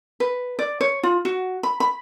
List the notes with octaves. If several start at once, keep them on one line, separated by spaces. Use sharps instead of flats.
B4
D5
C#5
F4
F#4
B5
B5